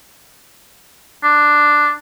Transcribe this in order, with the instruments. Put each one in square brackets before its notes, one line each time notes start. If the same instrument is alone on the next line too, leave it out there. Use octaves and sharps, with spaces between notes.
[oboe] D4